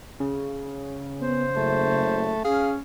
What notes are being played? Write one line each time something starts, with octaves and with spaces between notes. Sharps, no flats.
C#3
B3 C5
F#1 A3
C#4 G#4 F5